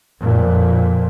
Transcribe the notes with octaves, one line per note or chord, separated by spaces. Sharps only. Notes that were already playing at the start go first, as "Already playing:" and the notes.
F2 A#2